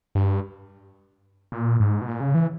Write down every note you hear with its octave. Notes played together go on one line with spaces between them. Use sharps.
G2
A#2
G#2
B2
A#2
C#3
E3